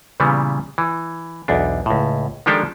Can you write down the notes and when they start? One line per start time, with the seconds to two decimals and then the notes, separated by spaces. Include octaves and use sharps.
0.20 A#2 C#3 E3 G3 B3
0.78 E3
1.48 B1 E2 D4
1.86 C#2 A2
2.46 D#3 F3 G#3 D4 G4 A4